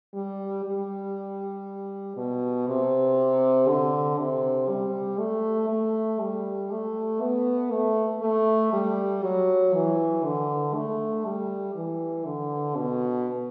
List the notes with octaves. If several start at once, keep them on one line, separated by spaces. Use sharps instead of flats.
G3
G3
B2
C3
D3
C3
G3
A3
A3
G3
A3
B3
A3
A3
G3
F#3
E3
D3
A3
G3
E3
D3
B2